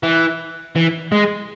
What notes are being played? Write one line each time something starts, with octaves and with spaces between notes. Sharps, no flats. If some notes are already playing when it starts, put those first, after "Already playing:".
E3
E3
G#3